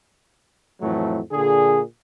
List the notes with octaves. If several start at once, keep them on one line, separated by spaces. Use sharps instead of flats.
F2 A2 E3 F#3 A3
A#2 D3 G#4